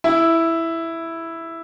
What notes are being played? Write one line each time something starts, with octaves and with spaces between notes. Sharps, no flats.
E4